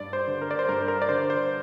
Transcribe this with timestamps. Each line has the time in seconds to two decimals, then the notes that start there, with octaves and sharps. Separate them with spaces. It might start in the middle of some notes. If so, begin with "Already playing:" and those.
Already playing: G2 D5
0.13 C5
0.27 D3
0.42 A#4
0.51 D5
0.59 C5
0.69 G2 A#4
0.82 C5
0.88 A#4
1.02 D5
1.09 D3 C5
1.30 C5